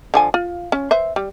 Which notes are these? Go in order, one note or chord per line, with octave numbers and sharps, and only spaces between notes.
D3 F3 G#5
F4
C#4
B4 C5 E5
G3